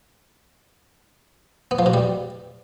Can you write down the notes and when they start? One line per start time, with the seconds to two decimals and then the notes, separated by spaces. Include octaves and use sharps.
1.71 B3
1.79 F3
1.86 B2
1.94 G3